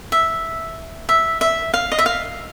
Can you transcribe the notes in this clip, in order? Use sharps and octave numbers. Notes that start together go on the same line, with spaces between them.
E5
E5
E5
F5
D#5
E5
F5